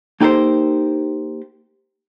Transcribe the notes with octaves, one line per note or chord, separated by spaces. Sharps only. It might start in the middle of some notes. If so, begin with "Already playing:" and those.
A#3 D#4 G4 A4 A#4 C5